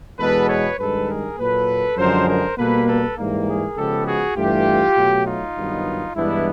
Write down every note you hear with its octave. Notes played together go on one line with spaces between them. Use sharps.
E2 B2 G#3 B3 A4 B4
B4 C#5
G2 D#3 G#3 A4 B4
G#4 A#4
A#2 F#3 A#3 A4 B4
F#2 D3 F3 G#3 A#4 C5
A#4 C5
B2 G3 A#3 A4 B4
A4 B4
G#2 E3 G3 A#3
G#4 A#4
C#3 F3 G#3 B3 G4 A4
F#4 G#4
G2 E3 A3 F4 G4
B2 F#3 A3
D#4 F4
G2 D#3 F#3 B3
G2 E3 G#3 B3 D4 E4